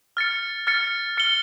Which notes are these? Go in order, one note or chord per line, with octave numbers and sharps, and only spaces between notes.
F6 A6 C#7
F6 A6 C#7
F6 C#7 G7